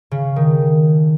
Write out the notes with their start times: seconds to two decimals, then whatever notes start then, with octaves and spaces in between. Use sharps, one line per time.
0.11 C#3
0.36 D#3